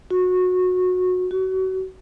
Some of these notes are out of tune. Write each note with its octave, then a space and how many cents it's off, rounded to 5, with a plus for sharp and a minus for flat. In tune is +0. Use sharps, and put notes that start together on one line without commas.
F#4 -20
F#4 +30